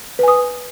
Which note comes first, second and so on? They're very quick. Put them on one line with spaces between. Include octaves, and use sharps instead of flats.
B4 G#5 D#6